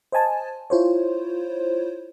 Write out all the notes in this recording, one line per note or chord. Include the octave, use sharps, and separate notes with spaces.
C5 D#5 G#5 A5
E4 F4 C5 C#5